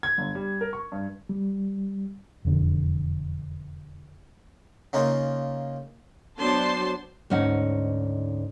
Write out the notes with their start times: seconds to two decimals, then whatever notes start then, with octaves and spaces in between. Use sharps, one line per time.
0.03 G#6
0.18 G1
0.35 G3
0.61 A#4
0.73 C#6
0.92 G2
1.29 G3
2.45 E1 F2 D3
4.93 C#3 A#3 D#4 F4
6.38 F#3 B3 D4 C5 A5 C6
7.30 D2 G#2 C#4 D#4 F#5